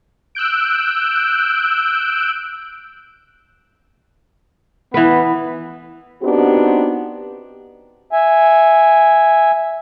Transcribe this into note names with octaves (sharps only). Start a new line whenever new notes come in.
E6 F#6 G6 D7
E3 B3 B4
B3 C4 D4 D#4 F#4 G4
E5 G#5